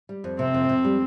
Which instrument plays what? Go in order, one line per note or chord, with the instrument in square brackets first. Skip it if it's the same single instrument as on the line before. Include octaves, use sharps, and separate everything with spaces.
[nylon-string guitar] G3
F2
[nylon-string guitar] C3 [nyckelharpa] C4
[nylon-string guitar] F2
F2
G3